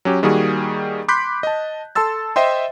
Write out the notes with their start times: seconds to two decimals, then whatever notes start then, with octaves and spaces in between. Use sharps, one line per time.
0.05 F#3 C#4 G4
0.23 D#3 G3 A#3 F#4 G#4
1.08 B5 C6 D6 F#6 G6 B6
1.43 D#5 A5
1.95 A4 A5 C6 E6 A6
2.36 C5 D#5 E5 G5 C6